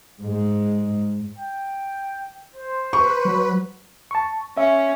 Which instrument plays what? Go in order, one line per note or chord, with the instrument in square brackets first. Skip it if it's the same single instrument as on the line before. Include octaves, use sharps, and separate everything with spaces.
[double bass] G#2 G#3
[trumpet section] G5
C5
[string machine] B4 [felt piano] C#6
[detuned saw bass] F#3
[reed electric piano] A5 C#6
[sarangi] C#4 [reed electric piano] E5